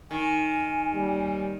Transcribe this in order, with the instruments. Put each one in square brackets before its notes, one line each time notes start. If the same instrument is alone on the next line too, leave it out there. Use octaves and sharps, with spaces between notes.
[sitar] D#3 [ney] G#5
[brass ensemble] D#2 G3